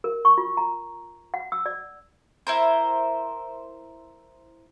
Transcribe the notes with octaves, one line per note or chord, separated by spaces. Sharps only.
A#4
C#6
F4
A#5
F#5
E6
D5
E4 A#4 C5